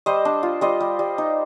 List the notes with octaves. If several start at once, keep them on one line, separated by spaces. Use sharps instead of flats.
G3 C5 D#5
D4
F4
G3 C5 D#5
G3
G3
D#4